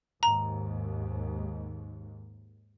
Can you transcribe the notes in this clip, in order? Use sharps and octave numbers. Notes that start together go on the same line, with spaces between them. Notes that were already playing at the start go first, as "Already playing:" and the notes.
D#2 G#2 A#5